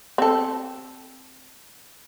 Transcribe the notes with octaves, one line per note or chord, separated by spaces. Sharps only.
C4 A4